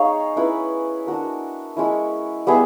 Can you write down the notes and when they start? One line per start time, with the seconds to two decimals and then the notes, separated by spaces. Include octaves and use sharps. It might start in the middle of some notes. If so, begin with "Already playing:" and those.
Already playing: D#4 G#4 C#5 F5
0.36 C#4 E4 G#4 B4
1.07 D4 F#4 A#4
1.77 G#3 C#4 E4
2.47 G3 B3 E4 G#4